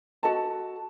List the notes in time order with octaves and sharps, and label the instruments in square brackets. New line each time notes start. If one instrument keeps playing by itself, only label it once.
[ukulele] F#4 A4 D#5 A5